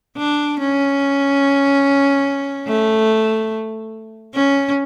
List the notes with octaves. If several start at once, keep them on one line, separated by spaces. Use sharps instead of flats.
D4
C#4
A3
C#4